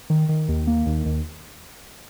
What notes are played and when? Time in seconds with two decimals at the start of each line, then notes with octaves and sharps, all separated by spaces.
0.10 D#3
0.29 D#3
0.48 D#2
0.67 A#3
0.86 D#2
1.06 D#2